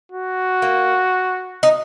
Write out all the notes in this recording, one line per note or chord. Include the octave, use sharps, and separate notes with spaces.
F#4
A#3
D#4